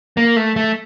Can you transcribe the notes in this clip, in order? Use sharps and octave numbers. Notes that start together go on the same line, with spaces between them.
A#3
A3
A3